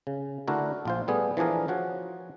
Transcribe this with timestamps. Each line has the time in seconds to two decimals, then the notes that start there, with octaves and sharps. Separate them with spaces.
0.07 C#3
0.48 D3 A3 D4 E4 F#4 A#4
0.85 A#1 F4 C5
1.08 G3 A3 B3 G#4
1.37 E3 F3 D4 G#4 A#4
1.68 F3 F#4 C#5